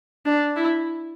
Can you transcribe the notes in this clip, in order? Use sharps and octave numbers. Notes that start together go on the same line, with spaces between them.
D4
E4